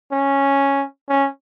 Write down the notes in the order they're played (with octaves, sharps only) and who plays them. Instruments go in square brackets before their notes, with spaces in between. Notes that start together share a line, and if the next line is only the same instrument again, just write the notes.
[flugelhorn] C#4
C#4